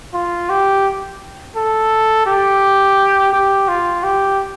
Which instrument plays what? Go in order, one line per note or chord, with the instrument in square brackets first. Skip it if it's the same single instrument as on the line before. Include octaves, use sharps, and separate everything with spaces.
[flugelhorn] F4
G4
A4
G4
G4
F4
G4